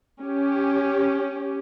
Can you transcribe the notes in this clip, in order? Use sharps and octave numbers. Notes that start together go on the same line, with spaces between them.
C#4 G4